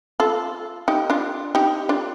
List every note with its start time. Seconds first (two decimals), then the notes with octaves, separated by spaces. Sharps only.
0.20 F4 A4
0.88 D#4 G4
1.10 D4 F4
1.55 D#4 G4
1.89 D4 F4